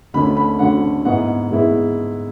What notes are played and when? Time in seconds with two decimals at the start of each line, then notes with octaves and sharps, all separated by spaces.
0.14 D2 D3 A3 C#4 B5
0.37 B5
0.59 D2 D3 A3 C#4 F#5
1.05 G#2 G#3 B3 E4 F#5
1.51 G#2 G#3 B3 E4